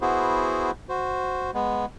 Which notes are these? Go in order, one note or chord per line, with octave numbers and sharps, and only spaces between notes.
B3 E4 F#4 G#4 C5
F#4 C5
G#3 B3